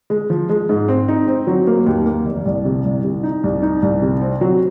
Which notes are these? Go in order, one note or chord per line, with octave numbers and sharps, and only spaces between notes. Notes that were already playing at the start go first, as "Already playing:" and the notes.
G#3
F3
G#3
G#2
C4
D#4
C4
F#3
A#3
D#2
A#3
F1
C2
C3
C2
C3
D#4
C2
D#4
C2
C3
C4
F#3